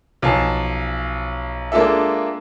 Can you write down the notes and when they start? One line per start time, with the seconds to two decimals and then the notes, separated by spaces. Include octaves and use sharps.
0.22 B1 F3 F5 G#5 A5
1.72 G#3 A#3 D4 F4 A4 E5